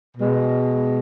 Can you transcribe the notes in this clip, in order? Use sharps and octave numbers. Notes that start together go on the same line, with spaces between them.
B2 G#3